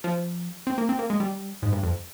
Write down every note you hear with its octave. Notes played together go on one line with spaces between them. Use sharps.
F3
C4
A#3
C4
A#3
G#3
G3
G#2
G2
F2